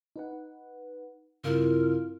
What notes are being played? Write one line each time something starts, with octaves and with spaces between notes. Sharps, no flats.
D#4 B4 F#5
G2 C#3 C4 E4 F4 A#4 F5